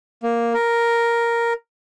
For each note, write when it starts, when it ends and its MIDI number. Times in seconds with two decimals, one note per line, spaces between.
0.23 0.53 58
0.54 1.53 70